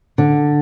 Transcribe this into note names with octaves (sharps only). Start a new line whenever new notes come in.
D3